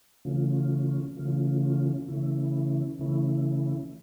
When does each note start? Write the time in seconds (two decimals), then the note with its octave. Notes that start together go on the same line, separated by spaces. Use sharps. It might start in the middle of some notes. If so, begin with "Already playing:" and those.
0.25 C#3 E3 A3 C#4 F4
1.17 C#3 E3 A3 C#4 F4
2.08 C#3 E3 A3 C#4 E4
2.99 C#3 E3 A3 C#4 E4